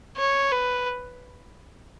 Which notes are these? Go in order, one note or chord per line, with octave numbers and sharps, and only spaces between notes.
C#5
B4